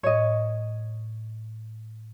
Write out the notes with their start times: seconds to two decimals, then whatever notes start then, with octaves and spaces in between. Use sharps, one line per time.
0.03 A2 C#5 D#5